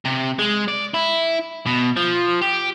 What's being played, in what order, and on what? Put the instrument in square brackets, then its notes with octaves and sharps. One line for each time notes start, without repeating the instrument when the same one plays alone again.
[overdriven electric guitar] C3
G#3
D5
E4
B2
F3
G4